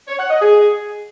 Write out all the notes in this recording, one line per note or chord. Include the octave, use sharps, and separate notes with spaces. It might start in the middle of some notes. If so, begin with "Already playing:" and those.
C#5
F#5
D#5
G#4